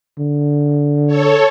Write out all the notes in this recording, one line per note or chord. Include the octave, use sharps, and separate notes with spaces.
D3
A4 C#5